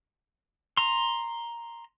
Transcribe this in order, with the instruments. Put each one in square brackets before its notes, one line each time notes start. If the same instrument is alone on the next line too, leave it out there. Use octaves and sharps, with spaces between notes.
[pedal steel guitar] A#5 C6